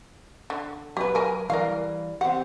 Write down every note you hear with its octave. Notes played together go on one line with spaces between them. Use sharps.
D3
F#3 G4 B4
A#4 G#5
E3 G3 A#4 F5
C4 G4 F#5